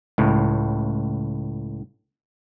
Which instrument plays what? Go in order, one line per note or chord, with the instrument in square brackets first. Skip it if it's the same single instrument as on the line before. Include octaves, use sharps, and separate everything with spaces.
[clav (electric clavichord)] C#2 A2